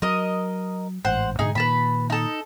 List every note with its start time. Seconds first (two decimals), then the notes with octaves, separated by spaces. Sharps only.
0.02 F#3 A#4 D#5
1.05 A1 G#2 C5 F#5
1.39 G#2 B2 D3 D#4 G#4
1.55 A#2 D#3 B4 A5 B5
2.10 D#4 A4